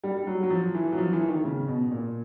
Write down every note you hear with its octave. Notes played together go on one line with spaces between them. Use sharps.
G3
G3
F#3
F#3
F3
E3
F#3
F3
E3
D#3
C#3
B2
A#2